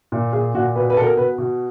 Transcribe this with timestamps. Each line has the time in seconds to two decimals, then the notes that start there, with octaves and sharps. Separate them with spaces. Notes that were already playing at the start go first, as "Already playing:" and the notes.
0.12 A#2
0.33 A#2 G#4
0.54 A#2 F#4
0.76 B2 B4
0.90 B4
0.97 B2 A4
1.03 A#4
1.17 B2 B4
1.38 B2